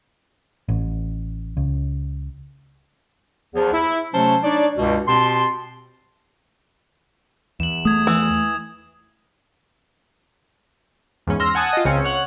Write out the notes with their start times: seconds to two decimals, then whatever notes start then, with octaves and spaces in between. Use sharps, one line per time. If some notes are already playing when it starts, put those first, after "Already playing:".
0.68 A1
1.57 C#2
3.55 E2 F3
3.73 E4
4.13 C3 F#3 A3 C#4 C5 A5
4.43 D4 D#4 C#5 D5
4.77 C#2 G2 B2
5.07 B2 C4 G4 A5 C6
7.60 E2 E7 F#7
7.85 A3 D#6 G#6
8.07 E3
11.27 E2 G#2 C#4
11.40 C6 E6 F6 A#6
11.55 F#5 G#5 A5 D#6
11.73 F4 D#5
11.85 C#2 C#3 C4 C#4 C#7
12.04 C#5 F#5 F#6